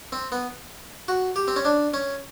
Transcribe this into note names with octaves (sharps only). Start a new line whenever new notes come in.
C4
B3
F#4
G4
C4
C#4
D4
C#4